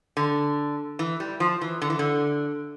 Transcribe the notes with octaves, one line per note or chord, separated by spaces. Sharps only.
D3
E3
G3
F3
E3
D3
E3
D3